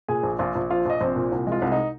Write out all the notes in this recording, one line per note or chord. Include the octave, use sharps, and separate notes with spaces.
A#2 G#4 G#5
A#1
A#1 F4 F5
A#1
F3 F4 F5
A#1 D#5
A#1 C4 C5
A#2
C2
G#3 F4
C2
D#4